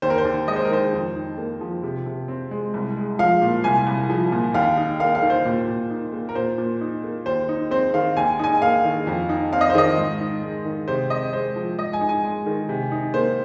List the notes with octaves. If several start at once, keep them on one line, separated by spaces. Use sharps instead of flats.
D#2 C5
A#4
C5
D#2
G#3 D#5
C5
A#4
D#3 C5
F2
D#4
A#3
F3
C3
C3
C4
G#3
C2
G#3
F3 F5
A#2
C2 G#5
C2
F3
A#2
D#2 F5
D#4
A#3 F5
F5
D#3
C5
A#2
A#2
D#4
A#3
A#4
A#2 C5
A#2
D#4
A#3
D#2 C5
D#4
C4 C5
D#3 F5
D#2 G#5
D#4 G#5
A#3 F5
D#3
F2
D#4
C4 F5
D#5
C5
D#3 D#5
G#2
D#4
G#3
D#3
C3 C5
C4 D#5
G#3 C5
F3
G#2 D#5
G#5
D#4
G#5
G#3
D#3
C3
D#4
A#3 C5